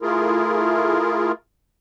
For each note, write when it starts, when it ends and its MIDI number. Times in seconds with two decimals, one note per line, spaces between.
0.02 1.32 57
0.02 1.32 64
0.02 1.32 65
0.02 1.32 68
0.02 1.32 70